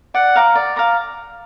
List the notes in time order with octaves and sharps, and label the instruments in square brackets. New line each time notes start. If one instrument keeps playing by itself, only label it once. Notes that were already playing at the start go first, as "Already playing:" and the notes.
[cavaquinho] D5 [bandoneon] F#5
[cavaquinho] F5 A#5 D6
D5
F5 A#5 D6